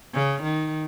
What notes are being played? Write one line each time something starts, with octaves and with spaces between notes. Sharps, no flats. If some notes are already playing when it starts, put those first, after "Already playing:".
C#3
D#3